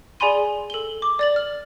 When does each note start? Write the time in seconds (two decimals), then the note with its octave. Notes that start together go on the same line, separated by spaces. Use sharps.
0.20 G#4 D5 G#5 B5 C6 D#7
0.70 A4 G7
1.02 D6
1.19 D5 A6 F#7
1.36 F6